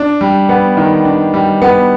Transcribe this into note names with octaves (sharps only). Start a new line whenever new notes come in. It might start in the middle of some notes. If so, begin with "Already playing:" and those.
Already playing: D4
G3
B3
D#3
D4
G3
B3